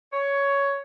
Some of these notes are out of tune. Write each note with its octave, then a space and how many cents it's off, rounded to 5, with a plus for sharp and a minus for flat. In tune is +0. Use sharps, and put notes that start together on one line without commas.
C#5 +10